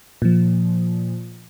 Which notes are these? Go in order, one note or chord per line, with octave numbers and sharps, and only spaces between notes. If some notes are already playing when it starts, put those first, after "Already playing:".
A#2 F3